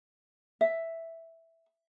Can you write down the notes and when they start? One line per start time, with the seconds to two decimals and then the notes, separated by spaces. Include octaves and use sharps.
0.61 E5